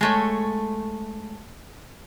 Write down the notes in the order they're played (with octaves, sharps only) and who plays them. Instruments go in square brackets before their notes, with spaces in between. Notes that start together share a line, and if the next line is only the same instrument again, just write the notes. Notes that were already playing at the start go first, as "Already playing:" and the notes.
[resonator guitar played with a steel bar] G#3 A3 C#5